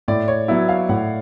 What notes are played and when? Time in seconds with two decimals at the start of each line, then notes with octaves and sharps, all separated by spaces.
0.08 A2 D5
0.28 C#5
0.48 F#3 B3 E4
0.69 F5
0.89 A2 F#5